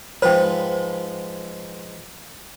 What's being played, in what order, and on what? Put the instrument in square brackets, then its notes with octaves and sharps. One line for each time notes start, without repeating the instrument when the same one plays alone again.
[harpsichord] G#2 F3 B4 [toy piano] C5 G5